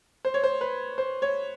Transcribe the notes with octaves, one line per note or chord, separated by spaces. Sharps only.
C5
C#5
C5
B4
C5
C#5